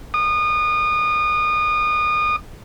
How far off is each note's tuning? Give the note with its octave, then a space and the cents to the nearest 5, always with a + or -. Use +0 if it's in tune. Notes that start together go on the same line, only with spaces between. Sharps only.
D#6 -30